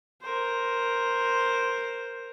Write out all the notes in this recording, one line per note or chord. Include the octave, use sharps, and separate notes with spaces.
A#4 C5